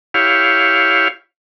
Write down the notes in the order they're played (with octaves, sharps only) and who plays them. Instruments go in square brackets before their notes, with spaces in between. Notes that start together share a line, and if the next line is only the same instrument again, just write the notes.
[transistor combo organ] E4 G4 C#5 F5